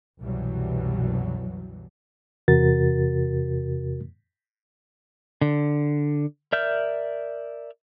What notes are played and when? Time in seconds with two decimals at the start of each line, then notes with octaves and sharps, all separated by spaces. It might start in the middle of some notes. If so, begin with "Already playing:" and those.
0.20 C2 F#2 B2 E3 F#3 G3
2.48 E2 C3 F#4 A#4 A6
5.41 D3
6.53 A#4 D5 E5 F6 G6